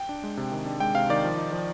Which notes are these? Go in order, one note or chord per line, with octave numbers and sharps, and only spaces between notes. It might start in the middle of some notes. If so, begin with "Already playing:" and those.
Already playing: G5
D4
G#3
C3
D#3
D4
G#3 G5
C3 F5
D#3 D5
F3
D#4
F3